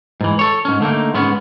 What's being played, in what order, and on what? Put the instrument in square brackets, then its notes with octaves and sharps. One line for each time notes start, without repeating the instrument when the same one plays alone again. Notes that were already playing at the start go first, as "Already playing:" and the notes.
[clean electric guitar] G#2 E3
A4 C#5
G#2 C#4
D3 A3 A#3 D#4
G#2 G#3 B3 C#4